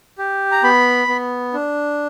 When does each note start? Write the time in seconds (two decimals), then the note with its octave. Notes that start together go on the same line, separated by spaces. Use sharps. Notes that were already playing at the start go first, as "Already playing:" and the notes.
0.18 G4
0.52 A#5
0.63 B3 B5
1.08 B3
1.53 D4